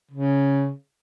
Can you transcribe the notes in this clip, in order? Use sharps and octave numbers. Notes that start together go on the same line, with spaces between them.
C#3